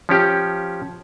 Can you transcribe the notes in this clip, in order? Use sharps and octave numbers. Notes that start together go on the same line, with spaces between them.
F3 C#4 G4